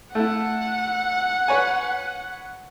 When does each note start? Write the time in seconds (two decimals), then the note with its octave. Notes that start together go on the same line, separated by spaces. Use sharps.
0.15 A3 E4 F#5
1.48 B4 C#5 G#5